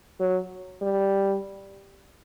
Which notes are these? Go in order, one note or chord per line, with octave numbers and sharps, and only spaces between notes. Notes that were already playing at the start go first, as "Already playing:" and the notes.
F#3
G3